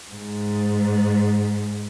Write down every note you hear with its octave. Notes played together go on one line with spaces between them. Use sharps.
G#2